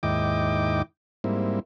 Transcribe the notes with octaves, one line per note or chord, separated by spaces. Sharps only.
D#2 G#2 E4 D#5 G5 D6
G#2 G3 A#3 C4 E4